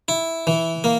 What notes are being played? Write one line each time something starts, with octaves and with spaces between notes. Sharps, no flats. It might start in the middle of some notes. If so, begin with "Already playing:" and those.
E4
E3
A#3